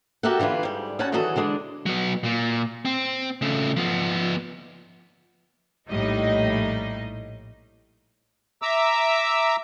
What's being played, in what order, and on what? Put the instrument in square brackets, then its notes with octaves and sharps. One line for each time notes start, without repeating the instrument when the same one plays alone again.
[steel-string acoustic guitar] F#4 G4 A4 A#4 E5 F#5
D3 E3 A#3 F4 B4
G#2 G3
C#4 D#4 F#4 C#5 F#5 A5
D#3 E3 F#3 F#4 G#4 A4
D3 E3 G#3 D4
[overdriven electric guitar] F#3 B3
A#2
C4
C#3 A3
F3 B3
[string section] A#1 A2 G3 D#4 D#5
[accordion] E5 A#5 D6 E6